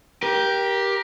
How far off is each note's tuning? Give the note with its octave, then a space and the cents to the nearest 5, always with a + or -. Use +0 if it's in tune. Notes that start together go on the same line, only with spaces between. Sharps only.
G4 +0 A#4 +25